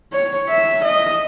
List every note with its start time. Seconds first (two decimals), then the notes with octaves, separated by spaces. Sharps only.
0.13 C#5
0.49 E5
0.84 D#5